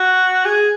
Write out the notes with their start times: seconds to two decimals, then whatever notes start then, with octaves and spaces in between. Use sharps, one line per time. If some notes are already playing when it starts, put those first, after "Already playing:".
Already playing: F#4
0.45 G#4